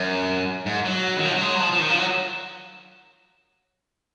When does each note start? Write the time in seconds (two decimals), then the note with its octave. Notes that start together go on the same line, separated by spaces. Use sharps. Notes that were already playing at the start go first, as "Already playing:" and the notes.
Already playing: F#2
0.66 G#2
0.85 F#3
1.18 D#3
1.26 F3
1.34 F#3
1.42 G#3
1.55 F#3
1.60 F3
1.72 F3
1.79 D#3
1.89 F3
1.99 F#3